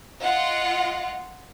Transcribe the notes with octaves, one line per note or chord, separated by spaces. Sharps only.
F4 D#5 F#5